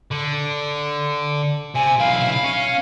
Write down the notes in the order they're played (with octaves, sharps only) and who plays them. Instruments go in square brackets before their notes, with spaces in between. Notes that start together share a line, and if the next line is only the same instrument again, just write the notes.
[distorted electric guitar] D3
[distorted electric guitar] C3 [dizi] G#5
[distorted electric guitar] B1 E4 [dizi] F5
[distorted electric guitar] C#4